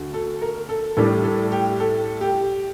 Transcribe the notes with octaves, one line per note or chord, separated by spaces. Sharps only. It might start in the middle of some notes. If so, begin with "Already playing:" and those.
Already playing: D2
A4
A#4
A4
A2 G3 D4 A4
A4
G4
A4
G4